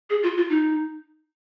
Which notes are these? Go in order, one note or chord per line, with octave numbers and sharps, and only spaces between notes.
G#4
F4
F4
D#4